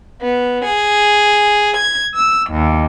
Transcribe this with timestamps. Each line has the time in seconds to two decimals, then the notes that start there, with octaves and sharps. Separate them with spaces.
0.22 B3
0.65 G#4
1.77 G#6
2.12 E6
2.50 D#2